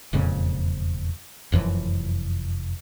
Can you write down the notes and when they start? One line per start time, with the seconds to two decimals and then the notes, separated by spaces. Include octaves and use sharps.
0.13 E1 F2 A#2 C#3
1.52 F1 F#2 E3 F3